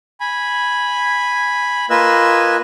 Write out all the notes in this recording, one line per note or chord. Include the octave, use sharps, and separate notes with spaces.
G#5 B5
A#3 F4 B4 D#5 G#5 E6